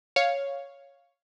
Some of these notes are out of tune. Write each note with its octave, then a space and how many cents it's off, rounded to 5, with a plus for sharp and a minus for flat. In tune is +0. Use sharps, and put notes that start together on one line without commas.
C#5 +0 F5 +0